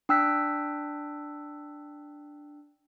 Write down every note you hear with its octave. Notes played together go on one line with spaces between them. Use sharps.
D4 G5 E6 F#6 B6